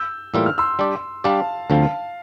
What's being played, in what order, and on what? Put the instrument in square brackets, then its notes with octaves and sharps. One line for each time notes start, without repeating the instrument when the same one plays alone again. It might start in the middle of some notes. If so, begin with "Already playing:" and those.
Already playing: [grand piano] E6 G6
[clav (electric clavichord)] A2 E3 G3 A#3 F4 [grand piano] E6
[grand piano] F6
C6 E6
[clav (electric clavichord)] G3 D4 G4 D5
[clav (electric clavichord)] G3 D4 G4 D5 [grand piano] F5 A5
[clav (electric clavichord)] D2 D3 F3 C4 F4 [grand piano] F5 A5